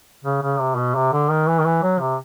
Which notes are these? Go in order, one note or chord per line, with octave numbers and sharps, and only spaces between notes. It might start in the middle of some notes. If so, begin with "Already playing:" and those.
C#3
C#3
C3
B2
C3
D3
D#3
E3
D#3
E3
F#3
C3